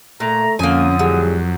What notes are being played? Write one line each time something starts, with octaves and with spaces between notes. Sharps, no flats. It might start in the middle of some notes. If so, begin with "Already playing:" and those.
A#2 A3 A#5
F2 D3 A#3 C#4 G#5 D#6
A2 F#3 G3 G#4